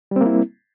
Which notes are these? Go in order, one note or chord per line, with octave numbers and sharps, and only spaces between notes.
G3 A#3 C4 E4